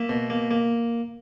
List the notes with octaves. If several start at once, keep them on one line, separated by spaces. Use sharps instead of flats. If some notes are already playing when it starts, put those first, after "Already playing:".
Already playing: A#3 E5
B2
A#3
A#3